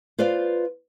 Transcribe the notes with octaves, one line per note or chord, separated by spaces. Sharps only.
F4 B4 C5 D5 F5